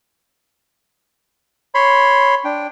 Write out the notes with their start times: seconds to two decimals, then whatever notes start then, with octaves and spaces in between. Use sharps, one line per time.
1.75 C#5 B5 C6
2.44 D4 G5